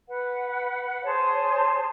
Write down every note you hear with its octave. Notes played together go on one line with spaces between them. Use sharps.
B4 F#5
G#4 C5 C#5 A5